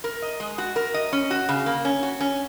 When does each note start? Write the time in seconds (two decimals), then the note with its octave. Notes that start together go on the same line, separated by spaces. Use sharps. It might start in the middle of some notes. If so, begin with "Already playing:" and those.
0.04 A#4
0.22 D#5
0.40 G#3
0.58 F#4
0.76 A#4
0.94 D#5
1.13 C#4
1.30 F#4
1.49 C#3
1.66 A#3
1.85 C#4
2.03 F#4
2.20 C#4